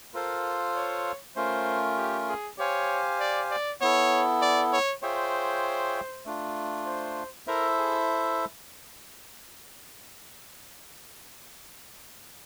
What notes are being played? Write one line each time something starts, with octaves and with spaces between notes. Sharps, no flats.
F4 A4 A#4 C5 F5
C#5
A3 C#4 F4 A#4 C5
G4
G#4
G4 C5 C#5 F5 G#5
D5
D5
B3 E4 A4 C#5
D5
C#5
F4 G#4 C5 C#5 E5 G5
A3 D4 F4
C5
E4 A4 A#4 C5 E5
G#4